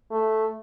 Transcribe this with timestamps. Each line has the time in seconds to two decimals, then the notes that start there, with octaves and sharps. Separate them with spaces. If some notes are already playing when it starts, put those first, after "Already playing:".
0.11 A3